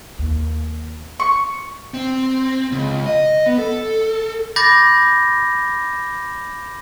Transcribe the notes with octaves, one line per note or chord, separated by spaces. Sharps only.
D#2
C#6
C4
C#2
D#5
B3
A4
B5 D6 G6 A6 A#6